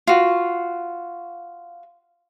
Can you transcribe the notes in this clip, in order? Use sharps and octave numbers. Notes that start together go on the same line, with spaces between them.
F4 F#4